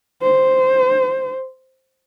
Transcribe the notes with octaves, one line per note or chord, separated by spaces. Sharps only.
C5